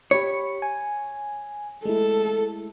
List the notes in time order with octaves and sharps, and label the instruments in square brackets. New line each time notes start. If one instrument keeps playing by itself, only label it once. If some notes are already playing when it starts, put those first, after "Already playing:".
[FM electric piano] G4 B5 C#7 [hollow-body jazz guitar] C#5
[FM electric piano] G#5
[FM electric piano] G#3 A3 E4 [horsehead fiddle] A4